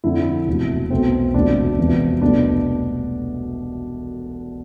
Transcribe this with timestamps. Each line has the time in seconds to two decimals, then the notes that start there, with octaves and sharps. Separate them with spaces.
0.04 F2 D3 F3 C4 E4
0.47 E1 D2 C3
0.90 B1 B2 A3 C4
1.34 E1 D2 C3 D4
1.78 E1 E2 C3 F3 B3
2.22 C2 B2 A3 D4